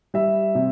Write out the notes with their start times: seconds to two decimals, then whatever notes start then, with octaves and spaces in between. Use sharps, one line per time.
0.14 G3 E5
0.55 C3